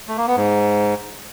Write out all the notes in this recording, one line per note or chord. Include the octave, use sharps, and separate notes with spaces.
A3
A#3
B3
G#2